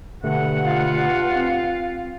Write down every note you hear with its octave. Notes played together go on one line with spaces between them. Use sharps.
G2 B2 D3 A3 F#5
F4
C4